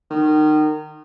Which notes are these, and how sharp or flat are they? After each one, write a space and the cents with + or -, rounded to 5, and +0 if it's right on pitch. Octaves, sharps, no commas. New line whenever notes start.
D#3 -25